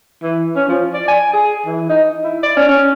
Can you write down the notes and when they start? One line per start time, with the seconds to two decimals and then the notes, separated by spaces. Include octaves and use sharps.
0.23 E3
0.56 C#4
0.69 F3
0.94 D5
1.08 G#5
1.33 G#4
1.66 E3
1.89 D#4
2.24 E4
2.43 D5
2.57 C#4
2.68 C#4